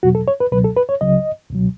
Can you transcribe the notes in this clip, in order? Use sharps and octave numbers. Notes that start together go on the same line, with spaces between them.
E2 B2 F#3 F#4
A4
C#5
B4
C#2 B2 F#3 B4
A4
B4
C#5
C#2 C#3 F#3 D#5
C#2 B2 F#3